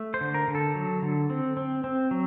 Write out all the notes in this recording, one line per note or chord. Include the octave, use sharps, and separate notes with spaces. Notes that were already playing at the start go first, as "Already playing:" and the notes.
Already playing: A3
C5
D3
A#4
D3
A4
F#3
D3
C4
C4
C4
F#3